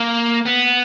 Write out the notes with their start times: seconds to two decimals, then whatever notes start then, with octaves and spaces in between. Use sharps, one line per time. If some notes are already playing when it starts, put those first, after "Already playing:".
Already playing: A#3
0.45 B3